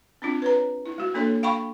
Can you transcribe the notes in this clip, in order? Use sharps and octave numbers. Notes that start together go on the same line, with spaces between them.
C4 D4 F4
B4 C#5 A#5
E4
G#3 F#4
A#3 D4 A4 C#5 C6
F5 G5 B5 C#6